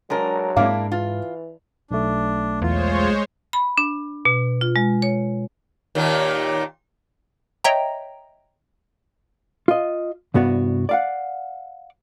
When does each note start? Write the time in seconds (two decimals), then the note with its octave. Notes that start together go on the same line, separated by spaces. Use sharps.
0.10 F#3 G#3 D4 A#4
0.56 G#2 G#3 A#3 D4 E4 F5
0.92 E3 F4
1.91 B1 A3 D4
2.62 E2 G#3 F4 C5 C#5
3.53 B5
3.78 D4
4.25 B2
4.61 F4
4.76 G#3
5.02 C#5
5.95 D#2 A#2 D#3
7.64 C#5 D#5 E5 G5 A#5
9.68 F4 D#5
10.34 C2 G2 B3 F#4 D5
10.89 D5 F5 F#5